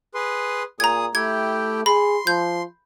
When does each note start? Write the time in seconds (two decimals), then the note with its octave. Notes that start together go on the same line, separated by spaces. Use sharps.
0.15 G#4 B4 C6
0.80 A#2 G#4 A#5 D#6 G#6
1.15 A3 E4 G4 G5 G#6
1.86 G#4 B5 C6
2.27 F3 G6